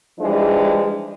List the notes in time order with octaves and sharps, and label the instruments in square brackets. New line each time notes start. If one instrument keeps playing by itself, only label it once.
[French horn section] E3 F3 G3 G#3 D4 D#4